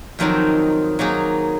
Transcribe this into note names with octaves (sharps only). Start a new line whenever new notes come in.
F2 D#3 F#3 C4 D#4
F#3 A#3 D#4 G#4